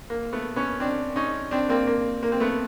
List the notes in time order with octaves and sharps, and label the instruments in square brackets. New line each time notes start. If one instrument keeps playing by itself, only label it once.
[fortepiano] A#3
A3 B3
B3 C#4
C4 D4
C#4 D#4
C4 D4
A#3 C4
A#3
A#3
C4
A3 B3